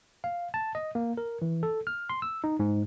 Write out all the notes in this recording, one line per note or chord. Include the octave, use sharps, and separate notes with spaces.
F5
A5
D#5
A#3
A#4
E3
A4
F6
C6
E6
D#4
G#2